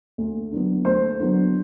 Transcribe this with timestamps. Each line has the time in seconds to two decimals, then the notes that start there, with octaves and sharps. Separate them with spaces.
0.18 D2
0.52 D3 F#3 B3
0.85 D2 C5
1.20 D3 F#3 B3